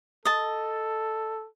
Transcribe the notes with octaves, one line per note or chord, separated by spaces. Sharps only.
A4 D#5 A5